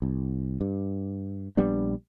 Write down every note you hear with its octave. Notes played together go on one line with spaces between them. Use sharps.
C2
G2
A#1 G3 B3 D4